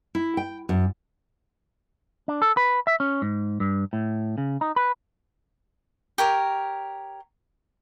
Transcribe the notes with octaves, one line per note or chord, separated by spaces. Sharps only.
E4
G5
F#2
D4
A4
B4
E5
C#4
G#2
G2
A2
C#3
D#4
B4
G4 A#4 C#5